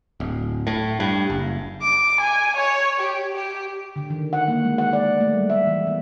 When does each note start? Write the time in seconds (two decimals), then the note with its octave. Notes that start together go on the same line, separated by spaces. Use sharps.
0.20 D1
0.67 A2
1.00 G2
1.30 F#1
1.82 D6
2.21 G#5
2.57 C#5
3.00 G4
3.35 G4
3.96 D3
4.10 D#3
4.33 F#5
4.48 A#3
4.64 G#3
4.78 F#5
4.93 D5
5.20 A3
5.33 G3
5.50 E5
5.67 E3
5.87 B3